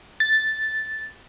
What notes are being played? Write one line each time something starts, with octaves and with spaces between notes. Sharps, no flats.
A6